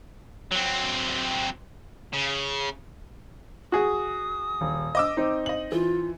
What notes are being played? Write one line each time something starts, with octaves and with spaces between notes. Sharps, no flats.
F#3 C4
C#3
F#4 G#4 D#6
D#1
D#5 D6 E6
C4 D#4
D#5 F#7
E3 F4